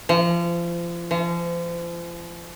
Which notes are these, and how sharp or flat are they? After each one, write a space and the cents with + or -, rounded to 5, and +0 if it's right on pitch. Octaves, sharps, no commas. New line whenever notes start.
F3 -30
F3 -35